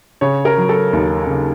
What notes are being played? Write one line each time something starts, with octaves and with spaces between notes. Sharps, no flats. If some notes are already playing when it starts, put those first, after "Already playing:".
C#3 C#5
A#4
F#3
A4
D#2
C#3